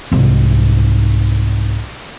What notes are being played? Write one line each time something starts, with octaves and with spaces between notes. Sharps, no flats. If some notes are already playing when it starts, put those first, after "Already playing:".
C2 G#2